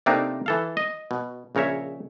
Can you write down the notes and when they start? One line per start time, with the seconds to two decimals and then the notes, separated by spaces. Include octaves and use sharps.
0.06 C3 A3 A#3 C4 D4 D#4
0.46 E3 A4 F5
0.77 D#5
1.11 B2
1.55 A#1 C#3 A#4 C#5 E5